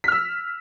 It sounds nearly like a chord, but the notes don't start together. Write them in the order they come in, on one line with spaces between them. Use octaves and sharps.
B6 F6 E6